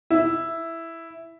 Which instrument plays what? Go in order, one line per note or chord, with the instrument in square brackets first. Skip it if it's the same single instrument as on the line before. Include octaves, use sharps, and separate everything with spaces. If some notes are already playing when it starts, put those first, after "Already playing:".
[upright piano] E4